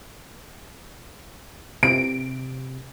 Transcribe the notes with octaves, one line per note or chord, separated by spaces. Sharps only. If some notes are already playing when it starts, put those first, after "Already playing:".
C3 D7